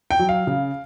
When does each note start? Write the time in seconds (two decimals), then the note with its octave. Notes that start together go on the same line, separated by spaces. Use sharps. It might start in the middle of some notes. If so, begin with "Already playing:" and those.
0.11 G5
0.19 F#3
0.29 F5
0.47 C#3